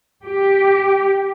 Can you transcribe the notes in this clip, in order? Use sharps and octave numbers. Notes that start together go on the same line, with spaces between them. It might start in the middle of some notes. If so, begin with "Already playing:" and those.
G4